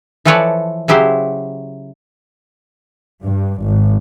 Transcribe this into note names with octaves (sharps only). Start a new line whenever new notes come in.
E3 F3 A4 B4 C#5 D5
C#3 F#3 E4 G4 C5
G2
G#1